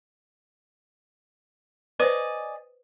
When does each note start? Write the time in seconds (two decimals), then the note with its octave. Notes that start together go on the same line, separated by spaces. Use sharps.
2.00 B4 C5 D5 D#5 G#5